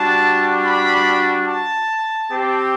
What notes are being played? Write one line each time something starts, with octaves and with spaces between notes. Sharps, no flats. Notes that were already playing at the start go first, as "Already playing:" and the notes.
Already playing: G3 D4 F#4 A5
B5
A5
C4 G4